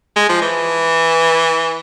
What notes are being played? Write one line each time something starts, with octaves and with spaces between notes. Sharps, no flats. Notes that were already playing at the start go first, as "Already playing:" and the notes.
G#3
F3
E3